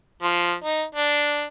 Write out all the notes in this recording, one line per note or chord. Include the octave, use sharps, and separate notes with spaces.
F3
D#4
D4